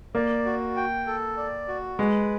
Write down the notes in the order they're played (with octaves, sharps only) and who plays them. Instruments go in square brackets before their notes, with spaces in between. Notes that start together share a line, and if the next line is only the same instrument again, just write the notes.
[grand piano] A#3 [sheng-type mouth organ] D5
[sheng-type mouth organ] F#4
G5
A4
D5
F#4
[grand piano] G#3 [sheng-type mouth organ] B4